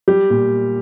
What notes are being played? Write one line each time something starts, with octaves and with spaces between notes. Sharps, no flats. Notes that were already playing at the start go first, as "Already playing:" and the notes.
G3 G4
A#2